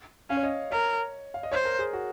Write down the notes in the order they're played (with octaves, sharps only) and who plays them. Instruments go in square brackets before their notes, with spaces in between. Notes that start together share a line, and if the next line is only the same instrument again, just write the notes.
[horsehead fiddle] C#4 [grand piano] F5
[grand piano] C#5
D#5
[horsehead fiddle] A#4 [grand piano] C#5
[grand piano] F5
D#5
[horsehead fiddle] C5 [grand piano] C#5
[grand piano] A#4
G#4
F#4